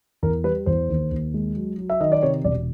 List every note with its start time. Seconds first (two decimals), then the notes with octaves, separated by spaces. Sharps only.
0.22 E2 A#4
0.44 G3 B4
0.66 E2 C5
0.89 D#2
1.11 D#2
1.34 G#3
1.56 F#3
1.78 F#3
1.90 E5
2.01 D#3 D#5
2.12 D5
2.22 C3 C#5
2.44 E1 D5